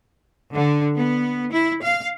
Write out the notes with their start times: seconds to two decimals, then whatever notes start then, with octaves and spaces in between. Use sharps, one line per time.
0.53 D3
0.95 B3
1.51 E4
1.82 F5